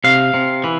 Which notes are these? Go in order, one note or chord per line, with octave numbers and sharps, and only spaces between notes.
C3 F5
C3
E3